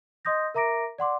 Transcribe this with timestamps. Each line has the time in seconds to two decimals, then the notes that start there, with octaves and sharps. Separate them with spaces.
0.25 D#5 C6 D#6 G6 A#6
0.55 A#4 E5 A#5 D6 A#6 D7
0.99 D5 F#5 C6 D6